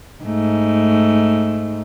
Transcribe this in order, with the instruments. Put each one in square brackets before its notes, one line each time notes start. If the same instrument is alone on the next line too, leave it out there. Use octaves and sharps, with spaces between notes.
[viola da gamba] G#2 A3